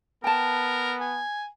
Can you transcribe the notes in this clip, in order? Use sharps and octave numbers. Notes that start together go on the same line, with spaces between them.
B3 A#4 G5 A5
G#5